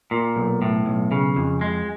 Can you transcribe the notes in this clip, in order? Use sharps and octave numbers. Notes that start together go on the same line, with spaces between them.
A#2
B1
A2
B1
C#3
F2
G#3